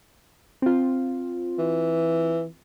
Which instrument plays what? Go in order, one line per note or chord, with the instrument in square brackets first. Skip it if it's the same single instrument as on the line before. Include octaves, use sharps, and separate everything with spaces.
[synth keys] C4 F4
[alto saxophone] E3